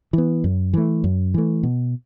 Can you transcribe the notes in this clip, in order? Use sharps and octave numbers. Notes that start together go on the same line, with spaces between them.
E3 B3
F#2
E3 A3
F#2
E3 A3
B2